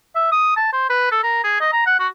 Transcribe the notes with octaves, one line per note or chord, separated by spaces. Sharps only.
E5
D#6
A5
C5
B4
A4
A#4
G#4
D#5
A#5
F#5
F#4